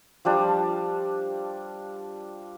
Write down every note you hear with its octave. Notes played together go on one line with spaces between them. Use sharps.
F3 G3 D4